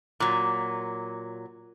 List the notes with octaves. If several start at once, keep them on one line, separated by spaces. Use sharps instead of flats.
A#2 F#3